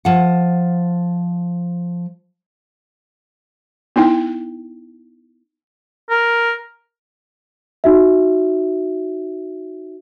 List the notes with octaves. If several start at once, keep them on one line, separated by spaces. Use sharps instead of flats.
F3 F#5
B3 D#4 E4 G5
A#4
D#4 F#4 E5